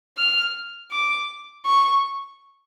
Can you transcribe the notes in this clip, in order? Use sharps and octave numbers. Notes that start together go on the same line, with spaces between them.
F6
D6
C#6